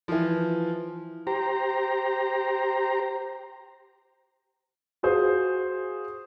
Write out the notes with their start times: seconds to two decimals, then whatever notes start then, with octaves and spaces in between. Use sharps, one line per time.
0.08 E3 F3
1.27 G4 C5 A#5
5.03 F4 F#4 G#4 C5